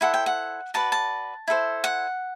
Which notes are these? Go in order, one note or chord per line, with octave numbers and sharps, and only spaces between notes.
E4 A4 C5 F#5
G5
F#5
F#4 B4 D5 A5
A5
E4 A4 C5
F#5